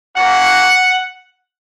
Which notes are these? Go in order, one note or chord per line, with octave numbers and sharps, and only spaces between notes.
A#3 C#4 F#4 F#5